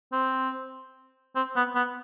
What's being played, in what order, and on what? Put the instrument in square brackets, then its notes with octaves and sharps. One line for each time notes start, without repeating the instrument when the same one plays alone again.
[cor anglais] C4
C4
B3
B3